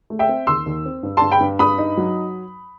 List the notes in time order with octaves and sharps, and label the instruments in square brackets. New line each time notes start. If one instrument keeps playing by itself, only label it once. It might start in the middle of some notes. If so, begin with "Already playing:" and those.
[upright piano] A3
E5 G5
C4
D#2 C6 E6
D#2
C4
G2
G2 A5 C6
G5 B5
G2
G2 B5 D#6
D#4
F#3